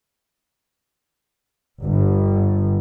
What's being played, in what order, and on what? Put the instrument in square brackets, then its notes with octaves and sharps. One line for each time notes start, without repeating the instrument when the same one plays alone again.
[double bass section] G1